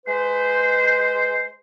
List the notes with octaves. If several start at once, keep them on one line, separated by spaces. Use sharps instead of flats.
G#3 B4 C5